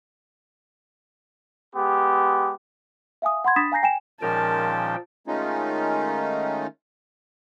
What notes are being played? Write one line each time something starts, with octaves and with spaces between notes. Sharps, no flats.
G#3 B3 G4
E5 F5 G#5 D#6
F#5 B5 C6 G#6
D4 B5 D#6 A6 B6 E7
F5 G#5 A#5 G6 A#6 C7
G5 G#5 E7
A#2 D#3 F3 G#3 C#4 A#4 G5 A5
D#3 G#3 A3 C#4 D#4 F4